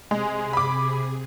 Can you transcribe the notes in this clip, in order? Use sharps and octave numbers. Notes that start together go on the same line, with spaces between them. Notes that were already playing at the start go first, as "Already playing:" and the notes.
C3 G#3 G#4
B5 D6